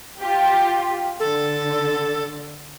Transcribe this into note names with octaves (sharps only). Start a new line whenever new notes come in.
F4 G4
D3 A4